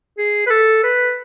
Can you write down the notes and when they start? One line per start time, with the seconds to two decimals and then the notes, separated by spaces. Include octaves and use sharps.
0.18 G#4
0.47 B4
0.50 A4
0.84 B4